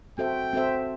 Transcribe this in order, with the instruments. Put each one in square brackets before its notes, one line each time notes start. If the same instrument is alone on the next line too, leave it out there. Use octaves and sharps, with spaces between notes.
[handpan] C4 F#4 A4 C5 E5 [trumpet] G5
[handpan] C4 F#4 A4 C5 E5